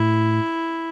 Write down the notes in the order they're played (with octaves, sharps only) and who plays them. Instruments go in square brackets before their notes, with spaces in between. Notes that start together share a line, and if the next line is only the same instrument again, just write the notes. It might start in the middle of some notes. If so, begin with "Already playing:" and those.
Already playing: [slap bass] A2 [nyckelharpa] E4